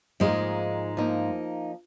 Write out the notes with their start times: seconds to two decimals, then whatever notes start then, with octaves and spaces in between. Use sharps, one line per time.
0.20 G#2 F3 G#3 A#3 D#4
0.97 F3 A#3 D#4